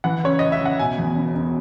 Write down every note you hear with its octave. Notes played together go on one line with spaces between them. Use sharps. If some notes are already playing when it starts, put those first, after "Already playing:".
E3 F#5
C#3 C#5
C#2 D#5
E5
C#2 F#5
B2 G#5
E2
E1
E1